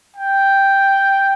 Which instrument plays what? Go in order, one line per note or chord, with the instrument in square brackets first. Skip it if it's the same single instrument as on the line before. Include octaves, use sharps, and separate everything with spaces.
[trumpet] G5